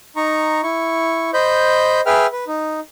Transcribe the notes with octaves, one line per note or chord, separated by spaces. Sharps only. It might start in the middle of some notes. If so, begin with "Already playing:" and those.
D#4 A#5 C#6
E4 C#6
C5 D#5 B5 G6
G#4 B4 E5 G5 F6
B4
D#4